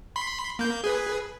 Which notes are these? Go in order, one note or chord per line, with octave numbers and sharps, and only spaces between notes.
B5 C6
A#3 G6
G#4 B4